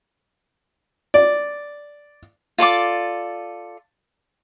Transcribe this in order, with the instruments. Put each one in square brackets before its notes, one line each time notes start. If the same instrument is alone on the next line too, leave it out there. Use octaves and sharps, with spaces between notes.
[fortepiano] D5
[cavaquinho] F4 A4 D5 D6